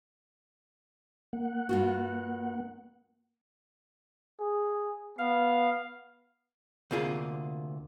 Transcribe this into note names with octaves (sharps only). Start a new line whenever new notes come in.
A#3 F#5
G2 F4 F#4
G#4
B3 F5
D2 C3 A#3 F4 G#4